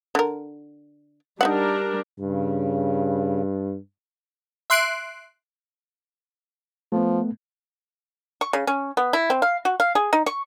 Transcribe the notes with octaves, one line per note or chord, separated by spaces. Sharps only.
D3 A#4
G3 D4 D#4 A#4 E5 F#5
G2 C#3
E5 C6 F#6 C7 D7
F3 A3 B3
C#6
C#3
C#4
B3
E4
C4
F5
F#4
F5
G#4
D#4
C#6